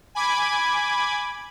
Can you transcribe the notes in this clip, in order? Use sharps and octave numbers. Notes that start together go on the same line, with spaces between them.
G#5 B5 D6 G#6